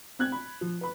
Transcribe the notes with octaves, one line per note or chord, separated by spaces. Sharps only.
C4 F#6 G#6
B5
F3
B4 B5